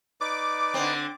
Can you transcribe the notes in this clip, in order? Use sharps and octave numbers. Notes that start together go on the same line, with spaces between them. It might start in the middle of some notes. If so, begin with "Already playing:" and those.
D#4 B4 D5 D6
D3 C4